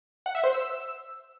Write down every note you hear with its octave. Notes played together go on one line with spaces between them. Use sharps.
F#5
E5
C5
E6